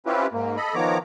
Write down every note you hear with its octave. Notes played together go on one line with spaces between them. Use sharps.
C4 C#4 E4 F4 G4 B4
G#2 A#3
A4 D#5 B5
D#3 F3 B3 C#5 A#5 D6